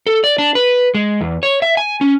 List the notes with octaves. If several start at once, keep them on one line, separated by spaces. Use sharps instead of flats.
A4
D5
D4
B4
G#3
E2
C#5
E5
G#5
C#4